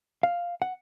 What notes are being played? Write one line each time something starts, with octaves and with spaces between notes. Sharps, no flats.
F5
F#5